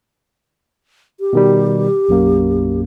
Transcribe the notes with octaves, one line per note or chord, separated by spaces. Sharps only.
G4
B2 D#3 G3
B1 F#2 A#3